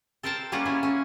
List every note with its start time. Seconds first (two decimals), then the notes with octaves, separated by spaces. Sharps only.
0.23 A4 A#4 C5 G5 A5 A#5
0.52 G3 A#3 C#4 F4 F#5 A#5
0.65 A#3 C#4 E4
0.83 C#4